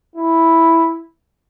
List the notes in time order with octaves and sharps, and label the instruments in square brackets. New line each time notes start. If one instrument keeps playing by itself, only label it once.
[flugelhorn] E4